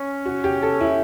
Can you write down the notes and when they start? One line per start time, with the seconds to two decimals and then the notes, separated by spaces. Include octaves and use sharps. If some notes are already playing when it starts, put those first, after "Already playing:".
Already playing: C#4
0.26 F#4
0.44 G4
0.63 A4
0.81 E4